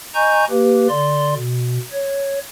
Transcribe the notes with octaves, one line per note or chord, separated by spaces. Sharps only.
D#5 G#5 A#5 C#6 G6
A#3 G4 B4
D3 D5 C6
B2
C#5